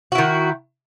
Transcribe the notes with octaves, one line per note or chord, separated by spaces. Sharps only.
D#3 E4 F#4